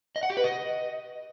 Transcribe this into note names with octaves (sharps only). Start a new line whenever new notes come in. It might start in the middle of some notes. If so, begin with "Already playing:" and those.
D#5
F#5
G4
B4
D#5